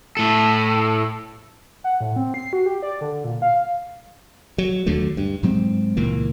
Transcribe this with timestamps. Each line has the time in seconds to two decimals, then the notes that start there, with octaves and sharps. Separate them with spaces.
0.17 A2 A4
1.84 F#5
2.01 A2
2.16 C4
2.34 C7
2.53 F#4
2.66 G4
2.83 D5
3.01 D3
3.24 A#2
3.42 F5
4.58 F#3
4.86 D#2 D3 F#3 A3
5.17 G2
5.43 G#2 F#3 G#3 C4
5.97 C#2 A#2 E3 A#3